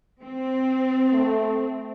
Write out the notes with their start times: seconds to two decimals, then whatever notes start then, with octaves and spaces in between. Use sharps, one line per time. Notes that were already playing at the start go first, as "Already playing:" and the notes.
0.20 C4
1.13 A3